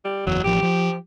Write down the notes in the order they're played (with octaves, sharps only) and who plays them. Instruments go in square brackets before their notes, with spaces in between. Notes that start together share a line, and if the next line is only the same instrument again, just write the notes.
[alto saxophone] G3
[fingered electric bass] F#1 E2 [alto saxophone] F#3
[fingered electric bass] A1 F3 [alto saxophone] G4
[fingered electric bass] F3